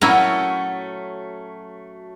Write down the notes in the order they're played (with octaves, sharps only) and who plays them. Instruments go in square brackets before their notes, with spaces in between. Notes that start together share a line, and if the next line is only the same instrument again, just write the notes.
[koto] A#2 E4 A#4 [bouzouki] F#3 A3 C#4